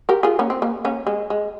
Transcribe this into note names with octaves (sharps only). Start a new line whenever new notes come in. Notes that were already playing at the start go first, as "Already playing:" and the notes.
G4 A#4
F4 G#4
A#3 C#4
C4
A#3
A#3 C#4
G#3
G#3